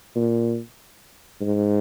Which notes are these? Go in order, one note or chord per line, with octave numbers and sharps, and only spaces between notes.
A#2
G#2